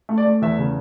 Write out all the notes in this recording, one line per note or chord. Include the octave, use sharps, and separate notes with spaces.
A3
D5
A3
E2 E5
C#3